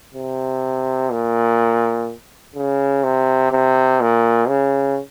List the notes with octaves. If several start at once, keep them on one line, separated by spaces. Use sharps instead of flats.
C3
A#2
C#3
C3
C3
A#2
C#3